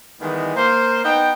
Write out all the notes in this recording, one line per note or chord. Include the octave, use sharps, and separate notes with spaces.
D#3 E3 G3 G#3 B3
A#3 C5
B3 D#4 G5